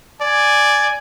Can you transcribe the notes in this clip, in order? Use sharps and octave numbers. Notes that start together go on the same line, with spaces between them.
D5 G#5